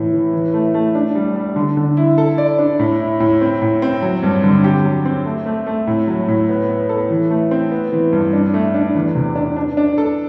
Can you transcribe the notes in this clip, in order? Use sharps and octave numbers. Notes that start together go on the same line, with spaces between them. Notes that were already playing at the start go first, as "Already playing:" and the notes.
Already playing: A2 E3
E3
E3
A3
A3
D4
G3
G3
D3
D3
E4
A4
D5
D4
A2
E4
A2
C4
A2
C4
F#3
G2
D3
G4
F#3
C4
A3
A3
A3
A2
F#3
A2
B3
B3
A4
E3
A3
C4
B3
E3
G2
D4
A3
D4
E2
C3
D4
D4
D4
A4